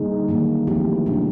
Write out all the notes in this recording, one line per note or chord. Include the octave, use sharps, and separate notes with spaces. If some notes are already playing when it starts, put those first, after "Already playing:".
Already playing: D3 G3 A#3 D#4 G#4
D#3 F#3 A#3
F3 A3 C4 E4 G4
B2 F#3 A3 D4